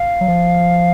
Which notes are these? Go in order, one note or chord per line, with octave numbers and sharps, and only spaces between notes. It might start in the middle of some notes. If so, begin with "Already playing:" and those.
Already playing: F5
F#3
F3